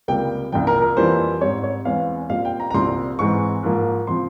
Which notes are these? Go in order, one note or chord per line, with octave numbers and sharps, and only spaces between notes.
C#2 C3 G3 A#3 G5
C2 A#2 F3 G5
A#4
A#4
F2 E3 G3 A#3 C5
G#2 G3 C4 C#5
C#5
E2 E3 G#3 C4 F5
A#2 G3 C4 F5
G5
A#5
A#5
C2 A#2 G3 C4 C6
G#2 E3 G#3 C4 C#6
G#2 F3 A#3
C3 F3 C4 C6